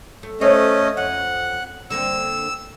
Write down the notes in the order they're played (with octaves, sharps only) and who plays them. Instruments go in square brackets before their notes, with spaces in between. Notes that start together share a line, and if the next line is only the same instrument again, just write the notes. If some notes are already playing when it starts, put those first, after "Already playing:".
[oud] A3
[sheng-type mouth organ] A3 C#4 D#5 [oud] A4 C5 C#5
[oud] F2 [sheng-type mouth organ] F#5
[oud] D3 A#3 C4 [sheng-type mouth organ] E6